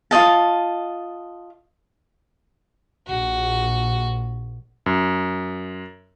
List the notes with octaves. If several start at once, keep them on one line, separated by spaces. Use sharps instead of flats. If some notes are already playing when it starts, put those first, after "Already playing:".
F4 G#4 D#5 A5
A#1 F#4
F#2